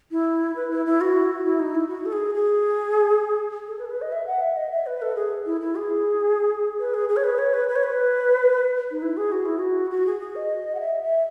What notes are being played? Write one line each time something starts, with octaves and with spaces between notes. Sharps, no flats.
E4
B4
E4
E4
F#4
E4
D#4
E4
F#4
A4
G#4
G#4
A4
B4
A4
B4
D#5
E5
F#5
E5
D#5
E5
B4
A4
G#4
E4
E4
G#4
B4
G#4
G#4
C#5
B4
C#5
B4
B4
C#5
B4
D#4
E4
G#4
F#4
E4
F#4
F#4
G#4
G#4
D#5
F#5
E5
E5